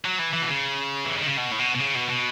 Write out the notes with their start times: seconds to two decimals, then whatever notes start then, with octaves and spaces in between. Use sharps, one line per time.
0.05 F#3
0.19 E3
0.34 E3
0.43 B2
0.49 C#3
1.05 E3
1.15 D#3
1.26 C#3
1.37 B2
1.51 A2
1.59 B2
1.75 B2
1.80 C#3
1.95 B2
2.09 B2